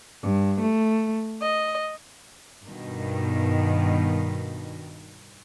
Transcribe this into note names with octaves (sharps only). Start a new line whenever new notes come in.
G2
A3
D#5
G2 B2 D#3